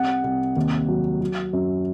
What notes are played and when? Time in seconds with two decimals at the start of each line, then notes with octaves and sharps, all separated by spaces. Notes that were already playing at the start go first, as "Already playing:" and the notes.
Already playing: C2 C3 F#5
0.24 C2
0.56 D#2
0.89 F#3
1.21 F#3
1.53 F#2